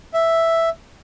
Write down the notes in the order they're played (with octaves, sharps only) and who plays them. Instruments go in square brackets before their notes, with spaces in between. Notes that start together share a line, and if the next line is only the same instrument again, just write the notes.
[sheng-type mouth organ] E5